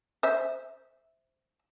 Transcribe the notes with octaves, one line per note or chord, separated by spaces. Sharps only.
C5 E5